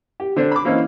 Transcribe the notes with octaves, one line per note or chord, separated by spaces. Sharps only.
G4
D3 C4 D4
B5 D6
E3 A#3 C4 C#4 D#4 E4